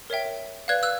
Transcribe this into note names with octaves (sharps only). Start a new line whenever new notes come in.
A#4 C#5 E5 G5
B4 D5 F5 F#6 G#6
E6 F#6